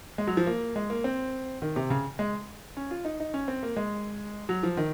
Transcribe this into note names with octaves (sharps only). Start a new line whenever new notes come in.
G#3
F#3
F3
A#3
G#3
A#3
C4
D#3
C3
C#3
G#3
C#4
F4
D#4
D#4
C#4
C4
A#3
G#3
F#3
F3
D#3